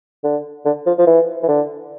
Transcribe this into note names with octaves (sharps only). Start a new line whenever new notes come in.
D3
D3
F3
F3
E3
E3
D3